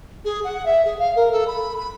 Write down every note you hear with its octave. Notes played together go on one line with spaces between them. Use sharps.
G#4
F#5
E5
G#4
F5
A#4
A4
B5
B5